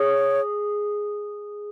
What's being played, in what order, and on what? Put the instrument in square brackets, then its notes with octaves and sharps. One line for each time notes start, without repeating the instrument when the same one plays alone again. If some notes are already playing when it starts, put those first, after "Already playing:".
Already playing: [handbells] G#4 [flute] C#5